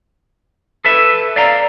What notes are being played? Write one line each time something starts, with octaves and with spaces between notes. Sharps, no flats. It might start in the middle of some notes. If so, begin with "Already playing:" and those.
A4 B4 E5
D5 F5 A#5